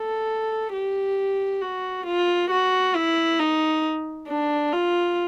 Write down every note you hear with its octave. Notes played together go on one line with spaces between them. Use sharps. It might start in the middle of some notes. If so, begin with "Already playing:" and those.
Already playing: A4
G4
F#4
F4
F#4
E4
D#4
D4
F4